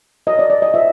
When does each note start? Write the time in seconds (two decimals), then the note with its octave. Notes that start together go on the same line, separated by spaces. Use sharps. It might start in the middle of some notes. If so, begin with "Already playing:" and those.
0.27 F#4 A#4 C#5 D#5
0.39 D5
0.50 D5
0.62 D#5
0.74 F4 A4 C5 E5